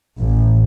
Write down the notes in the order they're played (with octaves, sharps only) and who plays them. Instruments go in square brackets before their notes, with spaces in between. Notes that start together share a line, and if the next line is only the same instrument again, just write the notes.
[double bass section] A1